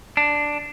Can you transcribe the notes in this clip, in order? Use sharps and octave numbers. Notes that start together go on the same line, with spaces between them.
D4